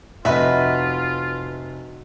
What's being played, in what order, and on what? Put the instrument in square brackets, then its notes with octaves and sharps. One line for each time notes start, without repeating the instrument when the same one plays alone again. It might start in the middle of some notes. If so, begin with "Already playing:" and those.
[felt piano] F1 [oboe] F4 [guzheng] F#4 B4 D#5 [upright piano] E5